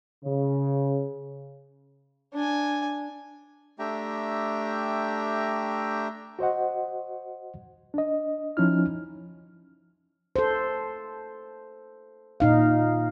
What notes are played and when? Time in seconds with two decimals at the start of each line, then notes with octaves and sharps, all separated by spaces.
0.25 C#3
2.34 D4 G#5
3.79 A3 D4 G4 E5 G5 A#5
6.39 F#4 C5 D#5 F#5
7.94 D4 D#5
8.57 F3 C#4 D#4 E4 F6
10.36 A4 C5
12.40 A#2 D#4 F5